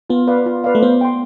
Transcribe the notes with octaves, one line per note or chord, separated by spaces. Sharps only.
B3 F4
B4 D5 F5
F4
B4 D5 F5
A3
B3 C5
G5 C6